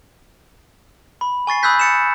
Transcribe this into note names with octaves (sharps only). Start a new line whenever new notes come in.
B5
G#5 C#6 A6 C7
B5 D#6 E6 F#6 G6 B6
A6 C#7 E7